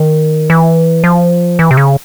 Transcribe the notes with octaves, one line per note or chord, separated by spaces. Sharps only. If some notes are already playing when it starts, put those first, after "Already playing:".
Already playing: D#3
E3
F3
E3
C3
C#3